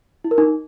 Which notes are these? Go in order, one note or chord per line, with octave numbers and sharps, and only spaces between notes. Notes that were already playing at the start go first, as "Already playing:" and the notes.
E4
A#4
D#4